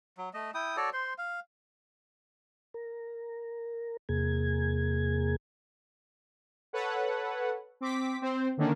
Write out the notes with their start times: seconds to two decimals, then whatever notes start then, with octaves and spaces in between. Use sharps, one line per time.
0.18 F#3
0.34 A3 D#5
0.54 E4 G5 D#6
0.77 F#4 A4 C#5 D5
0.93 C5 C6
1.18 F5
2.74 A#4
4.09 E2 C3 A#3 G#4 G#6
6.73 A4 B4 C#5 F#5
7.81 C4 D6 B6
8.22 C4 C5
8.57 D3 D#3 A#3 C#4 D4